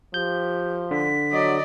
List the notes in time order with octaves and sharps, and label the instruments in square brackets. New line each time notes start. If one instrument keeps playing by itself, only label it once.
[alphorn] F3 [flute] G4 [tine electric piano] G6
[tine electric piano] D3 [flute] B6
[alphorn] F#3 [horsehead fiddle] D5 D#5